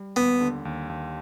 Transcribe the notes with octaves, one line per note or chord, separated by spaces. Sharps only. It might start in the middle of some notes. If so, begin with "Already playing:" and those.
Already playing: G3
D#2 B3
D3
D#2
D#2